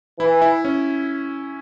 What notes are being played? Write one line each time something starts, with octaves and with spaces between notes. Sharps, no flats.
E3 E4
E4
C#4